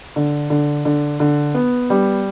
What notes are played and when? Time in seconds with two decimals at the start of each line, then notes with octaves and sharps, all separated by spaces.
0.16 D3
0.50 D3
0.85 D3
1.20 D3
1.55 B3
1.90 G3